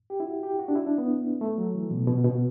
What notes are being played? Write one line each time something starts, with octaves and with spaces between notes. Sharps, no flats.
G4
E4
F#4
G4
F#4
D4
E4
D4
B3
A3
F#3
E3
B2
B2
B2